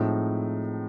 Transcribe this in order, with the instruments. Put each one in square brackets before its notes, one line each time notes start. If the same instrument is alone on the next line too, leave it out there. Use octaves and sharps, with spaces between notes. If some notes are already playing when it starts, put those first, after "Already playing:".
Already playing: [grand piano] A2 F3 G#3 C4 D#4